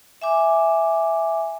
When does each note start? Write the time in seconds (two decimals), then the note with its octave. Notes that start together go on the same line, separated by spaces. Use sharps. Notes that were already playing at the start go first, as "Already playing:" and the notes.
0.22 E5 G#5 D6